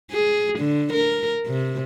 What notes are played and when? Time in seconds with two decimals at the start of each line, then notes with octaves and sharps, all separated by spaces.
0.12 G#4
0.59 D3
0.93 A#4
1.47 C3